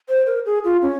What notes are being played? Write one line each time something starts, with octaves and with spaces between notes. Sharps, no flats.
C5
A#4
G#4
F4
C#4